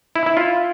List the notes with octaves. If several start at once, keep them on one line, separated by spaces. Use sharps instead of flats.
E4
E4
F4